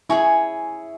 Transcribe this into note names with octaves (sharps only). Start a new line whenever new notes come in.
E4 G#4 C#5 G#5 C#6